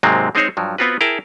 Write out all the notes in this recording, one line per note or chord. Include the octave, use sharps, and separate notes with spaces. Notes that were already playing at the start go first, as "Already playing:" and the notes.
G#2 C3 F#3 G#3 A#3 C4
G#3 C4 D#4 G#4 C5 C#5
G2 F3 F#3
B3 C4 F4 F#4 B4
E4 G#4 A#4 G5 A5